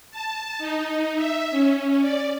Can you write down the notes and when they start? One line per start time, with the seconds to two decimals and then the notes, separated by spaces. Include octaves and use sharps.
0.11 A5
0.58 D#4
1.16 E5
1.51 C#4
2.01 D5